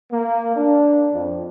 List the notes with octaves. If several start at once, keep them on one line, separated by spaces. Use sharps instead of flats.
A#3
D4
F2